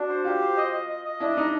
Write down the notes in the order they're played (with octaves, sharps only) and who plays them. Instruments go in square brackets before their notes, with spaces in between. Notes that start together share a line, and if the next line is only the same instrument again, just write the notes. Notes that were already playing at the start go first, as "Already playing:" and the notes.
Already playing: [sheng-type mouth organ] D4 [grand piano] F#4
[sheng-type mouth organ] C5
[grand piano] F4 [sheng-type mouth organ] G4
[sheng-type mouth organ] C5
D#5
D#5
D#5
D#5
[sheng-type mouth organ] D4 [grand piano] E4
[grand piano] D#4 [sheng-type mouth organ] D#5